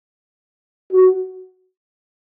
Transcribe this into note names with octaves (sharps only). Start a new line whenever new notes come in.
F#4